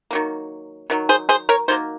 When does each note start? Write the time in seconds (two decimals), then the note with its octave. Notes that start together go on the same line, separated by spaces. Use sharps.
0.11 D#3 F#3 A#3
0.90 D#3 F#3
1.09 G#4 C5
1.29 G#4 C5
1.49 A#4 C#5
1.68 D#3 F#3 A#3 C5